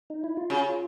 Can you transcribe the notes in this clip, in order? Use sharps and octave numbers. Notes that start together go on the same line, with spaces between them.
D#4
E4
F4
C#3 F#4
F4